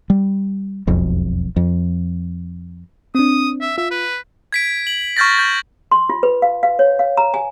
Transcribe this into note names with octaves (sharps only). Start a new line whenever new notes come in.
G3
E1 B1 F2
F2
C4 D4 D#6
E5
F4 E5
B4
G#6 B6 D7
F#7
C#6 F6 G6 A6 A#6
G6
C6
F4
B4
F5
F5
C#5
F5
A#5
G#5